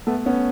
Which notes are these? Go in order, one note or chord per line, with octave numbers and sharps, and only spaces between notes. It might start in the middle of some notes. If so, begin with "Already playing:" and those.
A3 B3
B3 C#4